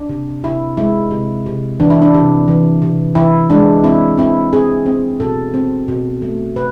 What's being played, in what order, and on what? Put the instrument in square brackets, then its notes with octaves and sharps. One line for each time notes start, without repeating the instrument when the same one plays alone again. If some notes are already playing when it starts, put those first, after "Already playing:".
Already playing: [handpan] D4
C3
C3 E4
G#3 E4
C3
C3
E3 D4
E4
D4
C3
E3
C3
E3 E4
G#3 D4
C4 E4
C4 E4
C4 G#4
C4
B2 A4
C4
B2
A3
B2 B4